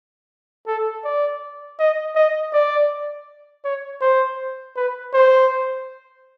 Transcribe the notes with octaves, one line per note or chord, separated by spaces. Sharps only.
A4
D5
D#5
D#5
D5
C#5
C5
B4
C5